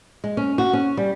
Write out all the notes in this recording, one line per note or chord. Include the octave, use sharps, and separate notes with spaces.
G#3
C#4
F#4
C#4
G3